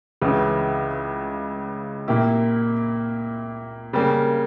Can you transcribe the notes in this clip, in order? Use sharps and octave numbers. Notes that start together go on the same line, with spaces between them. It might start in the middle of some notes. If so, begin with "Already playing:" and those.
C#2 C#3 E3
A#2 A#3 E4 G4
C#3 G3 A#3